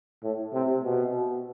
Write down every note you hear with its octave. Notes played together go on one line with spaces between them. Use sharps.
A2
C3
B2